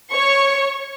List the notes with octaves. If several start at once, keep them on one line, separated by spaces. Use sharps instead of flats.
C#5 C#6